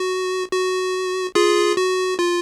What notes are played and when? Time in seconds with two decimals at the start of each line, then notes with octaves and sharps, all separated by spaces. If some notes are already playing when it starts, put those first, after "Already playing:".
Already playing: F#4
0.52 F#4
1.35 F4 G#4
1.77 F#4
2.19 F4